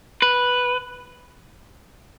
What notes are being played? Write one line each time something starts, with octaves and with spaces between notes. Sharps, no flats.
B4